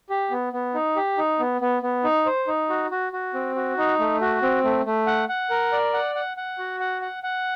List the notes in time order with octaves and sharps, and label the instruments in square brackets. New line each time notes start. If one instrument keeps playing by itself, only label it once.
[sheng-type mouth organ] G4
B3
B3
D#4
G4
D#4
B3
B3
B3
D#4
C5
D#4
F#4
F#4
F#4
C4
F#4
D#4
A3
F#4
C4
A3
A3
F#5
F#5
A#4
D5
F#5
F#5
F#5
F#4
F#5
F#5
F#5